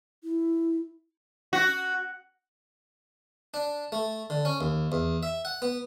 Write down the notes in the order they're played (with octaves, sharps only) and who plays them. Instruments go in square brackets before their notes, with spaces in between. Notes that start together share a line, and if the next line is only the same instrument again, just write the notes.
[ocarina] E4
[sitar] F#4
[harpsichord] D4
A3
D3
C#4
D#2
E2
E5
F#5
B3